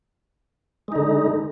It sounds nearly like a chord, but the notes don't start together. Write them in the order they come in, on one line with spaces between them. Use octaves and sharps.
G#3 D#4 D3